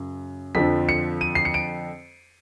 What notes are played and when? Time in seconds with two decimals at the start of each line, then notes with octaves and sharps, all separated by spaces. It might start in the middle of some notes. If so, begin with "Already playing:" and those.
Already playing: F#2 C#3
0.55 F2 D3 F3 B6
0.89 C#7
1.21 D#7
1.35 C7
1.45 C#7
1.54 D7